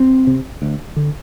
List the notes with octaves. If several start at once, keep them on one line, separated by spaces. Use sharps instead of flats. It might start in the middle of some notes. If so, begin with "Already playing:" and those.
Already playing: C4
C3
D2
D3